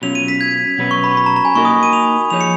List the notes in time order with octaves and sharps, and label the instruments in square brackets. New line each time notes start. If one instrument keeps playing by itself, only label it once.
[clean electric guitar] B2 F#3 C#4 F4 [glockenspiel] F7
[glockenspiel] D#7
B6
G#6
[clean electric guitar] B2 F#3 C#4 F#4 B4
[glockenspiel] C#6
B5
B5
A#5
A#5
G#5
[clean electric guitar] A#3 D#4 F#4 A#4 D#5 [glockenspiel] C#6
[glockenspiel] D#6
D#7
F7
[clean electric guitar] F3 A#3 D#4 G#4 C#5 [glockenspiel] F7
[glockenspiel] C#7